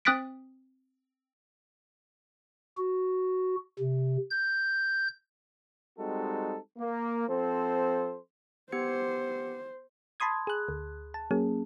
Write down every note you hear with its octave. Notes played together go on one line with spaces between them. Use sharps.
C4 D#6 F#6 A6 B6 D7
F#4
C3
G6
G3 G#3 C4 D#4 F#4 A4
A#3
F3 C4 A4 C5
B3 G4 C5 C#7
A5 B5 C6 D#6 G#6
G#4 F#6
D2
A5
F#3 A#3 C#4 G#4